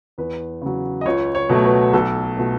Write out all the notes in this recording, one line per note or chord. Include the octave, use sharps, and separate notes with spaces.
E2 B4
C#3 F#3
D#5
C#2 C#5
C#5
B2 F#3 A3
B4
B1 A4
B2 A3